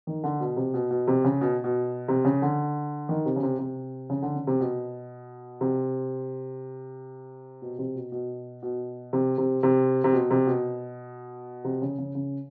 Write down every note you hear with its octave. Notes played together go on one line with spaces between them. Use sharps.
D#3
D3
B2
C3
B2
B2
C3
C#3
B2
B2
C3
C#3
D3
D#3
C3
C#3
C3
C3
C#3
D3
C#3
C3
B2
C3
B2
C3
B2
B2
B2
C3
C3
C3
C3
B2
C3
B2
C3
C#3
C#3
C#3